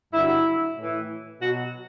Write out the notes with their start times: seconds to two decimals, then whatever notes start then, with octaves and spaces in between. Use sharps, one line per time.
0.12 G2 D3 F#3 E4
0.76 A2 E3
1.39 B2 F#3 F#4